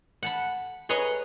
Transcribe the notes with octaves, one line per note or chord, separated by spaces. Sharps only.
F#5 A5 B5
G#4 B4 C#5 D#5 A#5